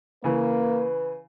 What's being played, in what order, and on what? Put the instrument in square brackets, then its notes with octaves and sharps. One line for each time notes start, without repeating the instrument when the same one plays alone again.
[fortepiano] C#3 E3 [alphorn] A#3 [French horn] B4